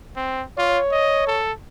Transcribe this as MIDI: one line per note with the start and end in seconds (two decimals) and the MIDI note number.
0.16 0.44 60
0.58 0.79 65
0.58 1.41 73
0.92 1.27 75
1.27 1.52 69